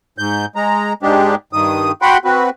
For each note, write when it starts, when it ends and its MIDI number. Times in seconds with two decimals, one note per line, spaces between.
0.18 0.46 44
0.18 0.46 91
0.56 0.93 56
0.56 0.93 82
1.03 1.35 44
1.03 1.35 56
1.03 1.35 62
1.03 1.35 67
1.53 1.92 43
1.53 1.92 51
1.53 1.92 87
2.02 2.17 66
2.02 2.17 78
2.02 2.17 79
2.02 2.17 83
2.02 2.17 84
2.25 2.50 60
2.25 2.50 66
2.25 2.50 71